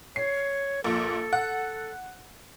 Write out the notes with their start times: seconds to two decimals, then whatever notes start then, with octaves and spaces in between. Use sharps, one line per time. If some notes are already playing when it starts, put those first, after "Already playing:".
0.16 C#5 C7
0.84 A#1 A#2 A4
1.33 F#5